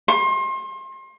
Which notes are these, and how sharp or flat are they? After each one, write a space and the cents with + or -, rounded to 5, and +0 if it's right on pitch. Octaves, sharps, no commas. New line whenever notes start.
C6 +35